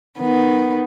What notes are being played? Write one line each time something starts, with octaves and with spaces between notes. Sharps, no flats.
D#3 B3